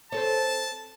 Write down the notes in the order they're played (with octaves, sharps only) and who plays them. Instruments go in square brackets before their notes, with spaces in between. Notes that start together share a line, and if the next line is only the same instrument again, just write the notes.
[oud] C4 A4 C#5 [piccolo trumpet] A5